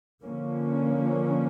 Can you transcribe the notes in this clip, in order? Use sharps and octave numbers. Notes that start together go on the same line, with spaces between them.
D3 F3 A#3 C#4